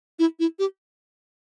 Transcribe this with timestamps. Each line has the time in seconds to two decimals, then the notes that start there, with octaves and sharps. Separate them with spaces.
0.19 E4
0.39 E4
0.59 G4